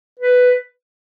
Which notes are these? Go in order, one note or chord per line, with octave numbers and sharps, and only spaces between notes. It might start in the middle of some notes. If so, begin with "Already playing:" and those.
B4